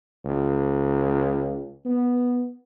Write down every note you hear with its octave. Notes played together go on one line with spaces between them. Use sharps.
C#2
B3